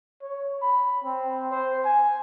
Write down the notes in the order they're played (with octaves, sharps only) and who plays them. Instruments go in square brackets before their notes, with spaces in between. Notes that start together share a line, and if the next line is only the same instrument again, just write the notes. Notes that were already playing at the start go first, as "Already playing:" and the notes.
[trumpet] C#5
B5
C4
C5
G#5